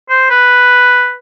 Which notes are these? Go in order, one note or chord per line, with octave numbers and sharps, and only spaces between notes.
C5
B4